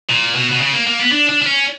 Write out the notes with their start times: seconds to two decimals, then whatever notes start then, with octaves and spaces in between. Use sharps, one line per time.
0.09 A#2
0.35 B2
0.51 B2
0.61 C#3
0.73 A#3
0.87 A#3
0.99 B3
1.12 D4
1.29 D4
1.42 D4
1.46 C#4